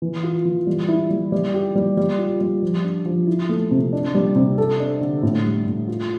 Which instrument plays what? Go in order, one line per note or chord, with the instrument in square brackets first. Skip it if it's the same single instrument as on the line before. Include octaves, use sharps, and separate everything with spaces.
[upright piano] E3
F4
E3
G3
E4
G3
G3
G4
G3
G3
F4
G3
F3
D4
F3
E4
A3
C3
D4
G3
C3
A4
D4
D3
A2
G3
A2
F4